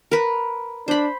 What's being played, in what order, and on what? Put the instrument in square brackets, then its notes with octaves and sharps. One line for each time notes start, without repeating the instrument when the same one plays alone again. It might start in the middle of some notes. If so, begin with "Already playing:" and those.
[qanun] A#4 B4
[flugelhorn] D4 [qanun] C5 B5